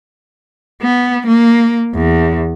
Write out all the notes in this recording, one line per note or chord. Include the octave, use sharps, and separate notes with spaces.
B3
A#3
E2